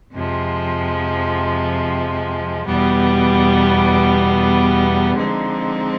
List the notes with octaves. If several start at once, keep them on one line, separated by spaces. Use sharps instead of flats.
F2 C3 F3 G#3
E2 B2 G3 B3
D3 F3 G#3 C4 D#4